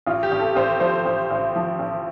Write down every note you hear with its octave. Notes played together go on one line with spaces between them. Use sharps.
A1 F4
G4
A1
A4
A1 C5
F3 C5
A1
A1
F3
A1